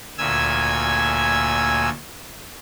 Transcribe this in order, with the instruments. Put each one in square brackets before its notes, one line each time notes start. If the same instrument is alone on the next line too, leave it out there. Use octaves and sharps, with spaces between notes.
[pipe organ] D2 A#2 G#5 E6 G#6